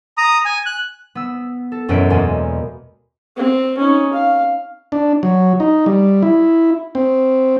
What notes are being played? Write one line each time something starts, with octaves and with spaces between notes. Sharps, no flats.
A#5 D#6
G#5
F#6
B3 E6
A4
E1 F#2 C#4 B4 D7
E2 B2 G#3 A#3 G#5 C6
C4
C#4 D#4
F5
D4
F#3
D#4
G3
E4
C4